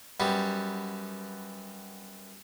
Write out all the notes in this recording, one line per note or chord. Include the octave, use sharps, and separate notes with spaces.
F#2 G3 B3